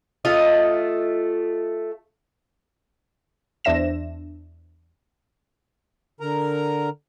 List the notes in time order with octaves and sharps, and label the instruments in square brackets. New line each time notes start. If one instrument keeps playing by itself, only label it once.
[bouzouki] A3 F4 D#5
[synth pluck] E2 D4 C5 E5 A#6 E7
[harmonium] D3 A#4 A#5